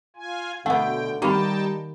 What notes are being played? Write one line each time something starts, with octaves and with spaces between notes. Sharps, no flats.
F4 G#5
B2 D3 A3 B3 F#5 G5
D#3 G3 A#3 D#4 G4 G5 A5 B5